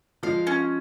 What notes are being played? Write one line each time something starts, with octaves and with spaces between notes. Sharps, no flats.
F3 G#3 F5
C#4